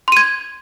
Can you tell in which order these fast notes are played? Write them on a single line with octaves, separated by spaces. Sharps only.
C6 D#7 G#6